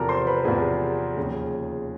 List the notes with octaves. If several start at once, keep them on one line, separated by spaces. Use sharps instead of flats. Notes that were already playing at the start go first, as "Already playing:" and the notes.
Already playing: E2 C3 F3 A4 A#4 A5 A#5
C5 C6
B4 B5
E2 C3 F3 G#4 G#5
D#2 C#3 F3